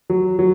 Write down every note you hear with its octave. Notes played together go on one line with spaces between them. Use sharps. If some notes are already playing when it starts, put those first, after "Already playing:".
F#3
F#3